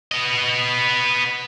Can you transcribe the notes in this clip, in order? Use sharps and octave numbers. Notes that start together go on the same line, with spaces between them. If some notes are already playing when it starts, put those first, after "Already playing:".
B3 D#5